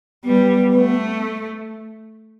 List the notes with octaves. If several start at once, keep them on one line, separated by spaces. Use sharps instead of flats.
G3 B3
A3